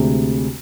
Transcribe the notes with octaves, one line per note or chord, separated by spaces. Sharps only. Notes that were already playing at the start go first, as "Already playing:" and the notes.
Already playing: D2 C3 G#3